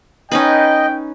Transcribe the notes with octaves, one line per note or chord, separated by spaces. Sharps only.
C#4 D#4 B4 D#5 G5